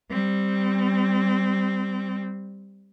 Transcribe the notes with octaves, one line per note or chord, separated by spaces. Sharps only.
G3 C4